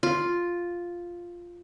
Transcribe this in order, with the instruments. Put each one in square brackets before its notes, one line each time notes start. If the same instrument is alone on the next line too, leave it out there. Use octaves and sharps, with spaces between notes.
[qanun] F4